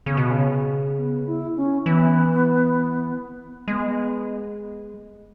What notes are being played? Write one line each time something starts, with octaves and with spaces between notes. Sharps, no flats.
C#3 B3
B2
C#3
B3
E4
C#4
E3 B3
G#3 B3